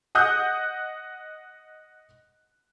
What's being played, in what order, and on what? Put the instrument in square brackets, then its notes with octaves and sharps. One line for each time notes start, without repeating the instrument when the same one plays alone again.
[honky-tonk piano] D#5 F#5 D#6 F#6 G6